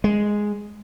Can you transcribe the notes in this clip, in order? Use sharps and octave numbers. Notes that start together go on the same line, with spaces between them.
G#3